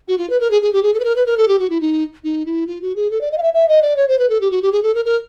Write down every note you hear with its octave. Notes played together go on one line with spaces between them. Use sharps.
F#4
F4
B4
A#4
G#4
G#4
G4
G#4
A4
B4
A#4
B4
A#4
A4
G4
F#4
E4
D#4
D#4
E4
F4
F#4
G#4
A4
D5
D#5
F5
E5
E5
D#5
D5
C#5
C5
B4
A4
G4
F#4
G4
G#4
A4
A#4
A#4